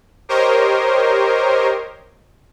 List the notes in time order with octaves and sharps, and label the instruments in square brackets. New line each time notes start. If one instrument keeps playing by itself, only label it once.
[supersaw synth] G4 A#4 C5 C#5 D#5